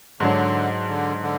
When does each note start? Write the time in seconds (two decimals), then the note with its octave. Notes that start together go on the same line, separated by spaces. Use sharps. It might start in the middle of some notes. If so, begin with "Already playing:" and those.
0.20 G#2 D3 F#3 D4
0.89 D3
1.23 D3